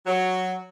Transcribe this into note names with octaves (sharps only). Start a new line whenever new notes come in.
F#3